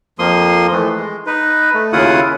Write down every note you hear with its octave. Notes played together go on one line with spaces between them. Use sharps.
F2 F3 A#3 C6 D#6
E3 A3
G#3
D#4 B4
A3
D#2 C#3 E4 F4 F#5 D#6